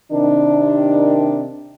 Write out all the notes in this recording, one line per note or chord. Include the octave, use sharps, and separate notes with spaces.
C3 D#3 D4